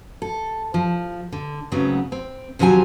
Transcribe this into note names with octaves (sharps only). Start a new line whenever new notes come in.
A4
F3
D3
G#2 C#3 F#3 A3 B3 C4
C4
D#2 C3 F3 F#3 C4 G#5